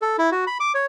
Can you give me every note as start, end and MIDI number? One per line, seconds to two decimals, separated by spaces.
0.02 0.16 69
0.18 0.30 64
0.32 0.45 66
0.47 0.58 83
0.60 0.72 86
0.75 0.86 73